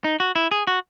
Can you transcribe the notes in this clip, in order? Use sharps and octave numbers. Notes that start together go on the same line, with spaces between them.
D#4
F#4
E4
G#4
F#4